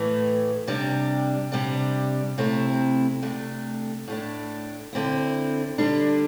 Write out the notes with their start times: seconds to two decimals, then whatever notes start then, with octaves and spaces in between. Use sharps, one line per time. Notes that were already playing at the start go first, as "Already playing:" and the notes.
Already playing: A2 E3 A3
0.67 C3 G3 D4
1.52 C3 G3 D4
2.38 C3 A3 C4 E4
3.23 C3 A3 D4
4.08 A2 A3 D4
4.93 D3 C4 E4
5.78 D3 G3 D4